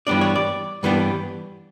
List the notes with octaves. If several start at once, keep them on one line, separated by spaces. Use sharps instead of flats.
G2 E3 G3 B3 D4 D5
C#5
D5
G2 E3 G3 B3 D4